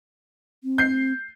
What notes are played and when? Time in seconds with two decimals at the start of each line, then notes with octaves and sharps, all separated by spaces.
0.64 C4
0.78 G6 C7